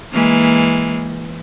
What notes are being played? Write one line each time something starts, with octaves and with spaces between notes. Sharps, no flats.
E3 G#3 A#3